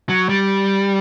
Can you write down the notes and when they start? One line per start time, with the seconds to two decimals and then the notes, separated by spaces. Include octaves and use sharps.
0.09 F#3
0.29 G3